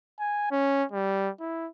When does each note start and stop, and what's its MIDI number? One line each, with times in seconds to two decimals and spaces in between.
0.20 0.48 80
0.51 0.84 61
0.92 1.30 55
1.40 1.68 64